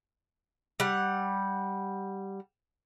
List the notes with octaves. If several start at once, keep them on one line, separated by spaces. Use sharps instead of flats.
G3 F#5